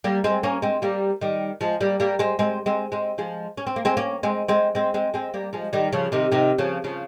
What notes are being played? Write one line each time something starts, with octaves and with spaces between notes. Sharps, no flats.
G3 A#3
G#3 C4
A#3 C#4
G#3 C4
G3 A#3
D#3 G3
F3 G#3
G3 A#3
G3 A#3
G#3 C4
G#3 C4
G#3 C4
G#3 C4
F3 G#3
C#4
C4
A#3
G#3 C4
A#3 C#4
G#3 C4
G#3 C4
G#3 C4
G#3 C4
G#3 C4
G3 A#3
F3 G#3
D#3 G3
C#3 F3
C3 D#3
C3 D#3
C#3 F3
C#3 F3